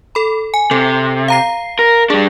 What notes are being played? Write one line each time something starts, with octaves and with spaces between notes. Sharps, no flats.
A4 B5
G#5
C3 A4
F5 A#5 C7
A#4
G3 D4 G#4